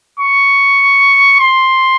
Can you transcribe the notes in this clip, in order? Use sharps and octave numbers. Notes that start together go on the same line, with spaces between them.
C#6
C6